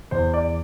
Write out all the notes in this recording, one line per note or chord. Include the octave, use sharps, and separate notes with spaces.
E2 C5
D5